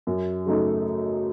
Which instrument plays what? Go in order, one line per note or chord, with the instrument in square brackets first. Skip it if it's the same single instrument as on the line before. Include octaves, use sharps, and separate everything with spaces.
[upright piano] F#2
C#3 F#3 A3 D#4